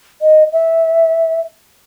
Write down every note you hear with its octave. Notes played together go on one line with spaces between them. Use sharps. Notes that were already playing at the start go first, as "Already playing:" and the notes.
D#5
E5